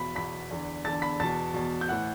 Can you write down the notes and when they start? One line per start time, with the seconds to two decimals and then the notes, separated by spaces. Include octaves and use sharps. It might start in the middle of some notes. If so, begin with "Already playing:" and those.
Already playing: E2 B2 B5 B6
0.15 E2 B2 B5 B6
0.51 E2 D3
0.84 E2 D3 A5 A6
1.02 B5 B6
1.20 E2 B2 A5 A6
1.54 E2 B2
1.81 G6
1.89 A2 E3 F#5 F#6